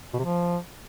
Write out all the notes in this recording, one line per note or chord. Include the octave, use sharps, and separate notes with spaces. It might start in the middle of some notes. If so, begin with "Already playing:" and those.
B2
C3
F3